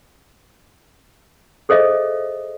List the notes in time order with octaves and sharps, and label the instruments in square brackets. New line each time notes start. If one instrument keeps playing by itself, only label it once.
[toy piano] G#4 A4 C5 D#5 E5